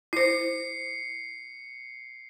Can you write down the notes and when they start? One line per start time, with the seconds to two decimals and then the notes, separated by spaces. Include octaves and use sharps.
0.13 E4 C5 C7 C#7